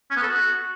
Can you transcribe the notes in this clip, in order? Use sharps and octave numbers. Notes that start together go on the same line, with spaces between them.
C#4
B3
A4
F#4